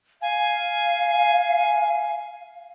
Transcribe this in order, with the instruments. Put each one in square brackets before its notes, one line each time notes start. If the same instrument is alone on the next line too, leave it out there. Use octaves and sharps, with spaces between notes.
[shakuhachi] F5 [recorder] G#5